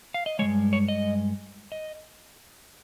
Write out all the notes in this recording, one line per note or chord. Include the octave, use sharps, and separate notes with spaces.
F5
D#5
G2 D#3 G#3 C#5
C#5
D#5
D#5